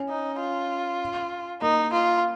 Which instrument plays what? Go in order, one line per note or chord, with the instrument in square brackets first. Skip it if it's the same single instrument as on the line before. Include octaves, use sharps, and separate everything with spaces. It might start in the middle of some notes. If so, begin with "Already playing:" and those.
Already playing: [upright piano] C#4
[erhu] D#4
F4
[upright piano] A#3 [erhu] D#4
[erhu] F4